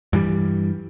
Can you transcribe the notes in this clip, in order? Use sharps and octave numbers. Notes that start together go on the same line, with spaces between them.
G2 E3 G3